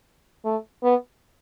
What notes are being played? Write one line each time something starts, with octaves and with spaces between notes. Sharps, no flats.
A3
B3